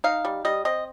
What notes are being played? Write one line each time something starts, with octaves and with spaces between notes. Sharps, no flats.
D#4 F5
G3
G3 D#5
C4 D#5